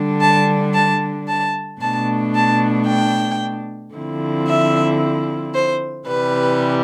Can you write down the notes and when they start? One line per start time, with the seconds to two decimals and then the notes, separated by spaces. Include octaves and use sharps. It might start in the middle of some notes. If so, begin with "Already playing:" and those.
Already playing: D3 G3 D4
0.21 A5
0.74 A5
1.27 A5
1.81 B2 A3 D4 A5
2.35 A5
2.87 G5
3.94 D3 F3 C4 E4
4.48 E5
5.54 C5
6.08 C3 E3 G3 B4